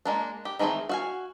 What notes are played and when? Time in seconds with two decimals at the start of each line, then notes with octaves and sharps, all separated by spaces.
0.05 G#3 A#3 D4
0.45 G4
0.59 D#3 E3 A3 C4 G#4
0.89 F#4 F5 G#5